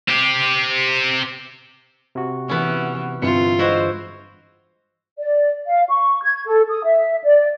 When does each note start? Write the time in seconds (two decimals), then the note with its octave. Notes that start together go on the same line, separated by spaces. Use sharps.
0.09 C4 G4
2.15 C3 F#4
2.49 E3 B3 C#4
3.22 G1 G2 C3 E3 F4 C#7
3.59 G#3 E4 F#4 C5
5.18 D5
5.67 F5
5.89 C#6
6.23 G#6
6.46 A4
6.69 D#6
6.84 E5
7.24 D5